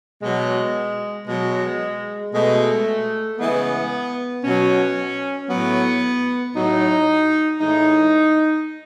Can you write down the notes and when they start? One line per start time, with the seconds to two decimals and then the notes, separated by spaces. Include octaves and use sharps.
0.22 B2 F#3 G#3
1.27 B2 F#3 G#3
2.33 B2 G#3 A3
3.39 C#3 E3 G#3 B3
4.44 B2 F#3 C#4
5.49 F#3 B3
5.55 A2
6.56 A2 F#3 D#4
7.60 A2 E3 G#3 D#4